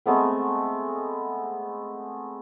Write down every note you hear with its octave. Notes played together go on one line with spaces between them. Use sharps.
G#3 A3 B3 C4